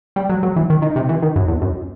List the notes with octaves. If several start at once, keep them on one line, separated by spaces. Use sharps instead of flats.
G3
F#3
F#3
E3
D#3
D#3
C3
E3
D#3
F#2
E2
F#2